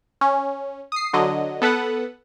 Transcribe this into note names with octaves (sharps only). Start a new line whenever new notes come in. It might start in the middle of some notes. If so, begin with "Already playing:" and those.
C#4
D#6 C7
D3 F#3 D#5
B3 A4 B4 F#5